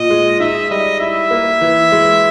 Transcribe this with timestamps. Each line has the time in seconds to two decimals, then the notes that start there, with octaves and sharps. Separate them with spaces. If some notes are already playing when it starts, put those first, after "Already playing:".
Already playing: A#2 D#5
0.10 G#3
0.40 D#4 E5
0.71 G3 D#5
1.00 E4 E5
1.31 A#3
1.61 E3
1.92 G#3